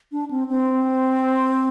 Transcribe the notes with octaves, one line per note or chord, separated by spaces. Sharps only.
D4
C4
C4